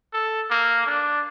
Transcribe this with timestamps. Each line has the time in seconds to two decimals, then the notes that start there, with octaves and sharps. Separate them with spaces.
0.13 A4
0.50 A#3
0.86 D4